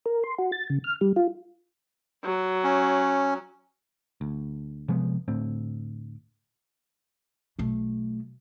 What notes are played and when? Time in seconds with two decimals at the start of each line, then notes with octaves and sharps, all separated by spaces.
0.06 A#4
0.24 C6
0.38 F#4
0.52 A6
0.70 C#3
0.84 F6
1.01 G3
1.16 F4
2.24 F#3
2.64 C#4
4.21 D2
4.88 C3 F3 G#3 B3
5.28 D2 A2 C4
7.59 B1 A3